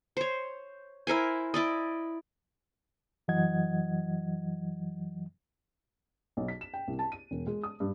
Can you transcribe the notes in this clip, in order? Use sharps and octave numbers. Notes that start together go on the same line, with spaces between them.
C5 C#5
E4 A#4 C5 G#5
E4 D5 D#5
F#2 E3 F#3 D#5 F#5 G#6
B1
B6
E7
G5
C2
A5
D#7
E1
G#3
D#6
G2